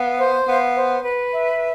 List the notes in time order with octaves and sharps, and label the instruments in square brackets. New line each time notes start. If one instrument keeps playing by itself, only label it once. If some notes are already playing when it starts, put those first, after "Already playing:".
Already playing: [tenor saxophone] B3 [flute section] F5
[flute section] C5
[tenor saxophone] B3 [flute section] F5
[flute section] C5
B4
E5